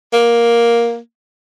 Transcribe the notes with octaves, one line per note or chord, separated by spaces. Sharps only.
A#3